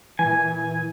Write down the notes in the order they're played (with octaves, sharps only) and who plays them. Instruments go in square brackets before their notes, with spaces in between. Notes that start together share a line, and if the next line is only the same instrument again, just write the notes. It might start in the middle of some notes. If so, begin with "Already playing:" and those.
[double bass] A#2 [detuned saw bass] E3 [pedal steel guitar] G#5